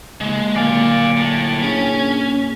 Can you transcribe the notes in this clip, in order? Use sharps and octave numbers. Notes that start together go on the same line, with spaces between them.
D#2 C#3 G#3 A5 D6
A#2 D3 F#3 D5 F5 G#5
A2
C#4 D4 G#4